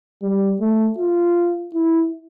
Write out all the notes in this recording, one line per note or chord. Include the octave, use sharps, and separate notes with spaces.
G3
A3
F4
E4